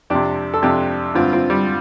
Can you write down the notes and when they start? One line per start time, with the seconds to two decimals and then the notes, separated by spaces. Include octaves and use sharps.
0.10 F2 C3 D4 G4
0.54 A4
0.63 F2 C3 D4 G4
1.15 G2 D3 C4 F4
1.33 C4 F4
1.50 G3